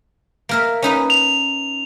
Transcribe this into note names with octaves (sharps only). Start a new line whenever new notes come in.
A#3 A#4 E5
C#4 D#4 B4
F7